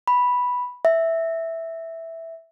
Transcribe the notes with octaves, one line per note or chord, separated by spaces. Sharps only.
B5
E5